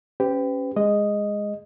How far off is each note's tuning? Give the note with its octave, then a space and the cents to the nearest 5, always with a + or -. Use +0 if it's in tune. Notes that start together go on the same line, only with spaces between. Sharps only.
C#4 +0 G4 +0 B4 +40
G#3 -10 D#5 +0